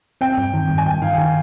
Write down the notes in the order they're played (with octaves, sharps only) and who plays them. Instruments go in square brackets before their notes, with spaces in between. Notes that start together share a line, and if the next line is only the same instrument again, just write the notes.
[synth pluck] C4 [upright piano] G5
[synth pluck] G2
D#3
G2
[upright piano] G#5
[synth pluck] G2 [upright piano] G5
[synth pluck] D#3 [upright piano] F5
[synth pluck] D#3